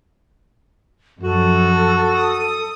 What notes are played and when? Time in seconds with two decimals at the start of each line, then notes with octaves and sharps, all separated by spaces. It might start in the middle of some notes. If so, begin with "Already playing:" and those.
1.23 F#2 F3 F#4 A4
2.16 D#6